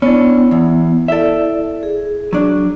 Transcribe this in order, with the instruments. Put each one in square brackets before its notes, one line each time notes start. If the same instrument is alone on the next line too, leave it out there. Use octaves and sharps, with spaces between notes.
[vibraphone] B3 E4 [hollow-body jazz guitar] C#4 D4
[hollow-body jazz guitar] E2
[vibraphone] E4 D5 [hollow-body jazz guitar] A4 E5
[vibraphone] G#4
[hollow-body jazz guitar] F#3 D4